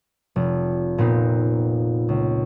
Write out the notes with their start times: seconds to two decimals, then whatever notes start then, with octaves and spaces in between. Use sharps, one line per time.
0.36 F1
0.98 A#2 B3 C4 D#4
2.09 C#2